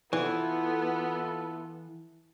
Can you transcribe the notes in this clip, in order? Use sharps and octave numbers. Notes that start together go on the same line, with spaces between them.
E3 B3 E4 F4 A4